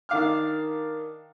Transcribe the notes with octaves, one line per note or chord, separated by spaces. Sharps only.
D#3 D4 F5 D6 F6